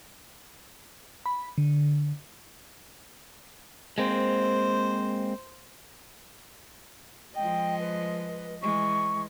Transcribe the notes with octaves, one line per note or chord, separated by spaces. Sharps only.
B5
D3
G#3 A#3 C4 C5
F3 G#3 D#5 G5
B4
E3 G#3 C#6